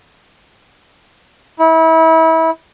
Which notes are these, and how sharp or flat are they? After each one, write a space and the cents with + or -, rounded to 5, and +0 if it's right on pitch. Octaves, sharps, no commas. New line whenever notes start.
E4 -30